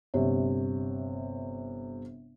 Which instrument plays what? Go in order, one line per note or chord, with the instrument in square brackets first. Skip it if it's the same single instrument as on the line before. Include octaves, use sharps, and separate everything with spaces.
[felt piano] G1 C3 G3 C#5